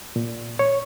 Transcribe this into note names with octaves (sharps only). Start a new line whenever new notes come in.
A#2
C#5